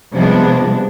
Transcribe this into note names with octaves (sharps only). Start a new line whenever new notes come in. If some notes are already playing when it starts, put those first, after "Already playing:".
C3 F3 G3 G#3 B3 D4